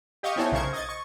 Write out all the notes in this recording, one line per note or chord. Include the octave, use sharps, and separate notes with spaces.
G4 D#5 F5 C#6 D#6
B3 C4 E4 A4 C#5 G#5
B1 C#3 A#4 C5 C#6 G#6
D#5 G#6 A6
C#6